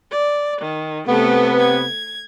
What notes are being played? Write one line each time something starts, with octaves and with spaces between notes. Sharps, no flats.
D5
D#3
C3 A3 B3 A4
G#6